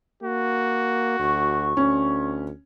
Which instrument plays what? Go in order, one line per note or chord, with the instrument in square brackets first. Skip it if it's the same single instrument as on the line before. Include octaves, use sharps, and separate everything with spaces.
[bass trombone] A#3 [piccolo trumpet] F#4
[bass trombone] D2 [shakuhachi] C#6
[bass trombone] D2 [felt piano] C#4